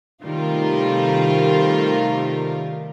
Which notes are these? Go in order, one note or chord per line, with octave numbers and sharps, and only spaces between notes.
C3 D#3 G3 A3 F4 A#4